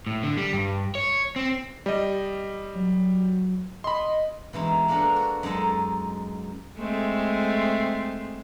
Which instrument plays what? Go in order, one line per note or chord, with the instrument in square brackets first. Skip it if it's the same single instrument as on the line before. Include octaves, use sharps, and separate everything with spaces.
[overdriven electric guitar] A2
D3
G3
G2
C#5
C4
[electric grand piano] G3 D#5
[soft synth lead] F#3
[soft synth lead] D#5 [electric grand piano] B5 C6
[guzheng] B2 E3 G#3 D#4
G#3 A#3 D4 A4 A#4 F#5
F#4
F#2 G#3 D#4 A4 D#5 A5
[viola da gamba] G#3 A3 C4